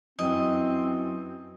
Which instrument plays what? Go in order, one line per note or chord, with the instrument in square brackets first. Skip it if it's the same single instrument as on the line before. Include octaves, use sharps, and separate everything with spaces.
[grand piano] F#2 E3 F#3 [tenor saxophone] C4 [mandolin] D#5